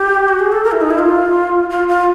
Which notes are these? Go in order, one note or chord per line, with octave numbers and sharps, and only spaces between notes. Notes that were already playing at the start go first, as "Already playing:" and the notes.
Already playing: G4
F#4
G#4
A4
A#4
E4
D#4
E4
F4
F4
F4